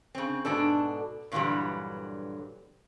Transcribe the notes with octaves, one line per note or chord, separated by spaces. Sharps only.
C#3 C4
G#2 B2 D4 A4
G2 A#2 D3 E3 F#3 G3